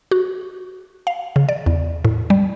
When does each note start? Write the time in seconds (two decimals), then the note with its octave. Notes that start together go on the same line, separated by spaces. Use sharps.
0.11 F#4
1.07 F5
1.36 C#3
1.49 D5
1.66 E2
2.05 A2
2.30 G3